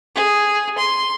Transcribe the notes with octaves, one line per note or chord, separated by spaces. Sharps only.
G#4
C6